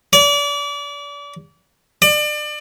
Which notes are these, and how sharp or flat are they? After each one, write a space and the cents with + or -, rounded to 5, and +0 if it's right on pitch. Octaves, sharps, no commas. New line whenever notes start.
D5 -35
D5 +30